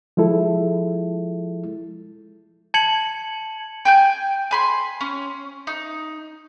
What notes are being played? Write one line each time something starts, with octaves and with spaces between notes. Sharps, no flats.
F3 G#3 E4 A4
A5 G#6 C#7 F#7
G5 G#5 G6
G#5 B5 C6
C#4
D#4